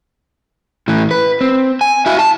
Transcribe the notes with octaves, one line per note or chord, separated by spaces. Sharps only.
A2 E3
B4
C4
G#5
E4 F#4
A5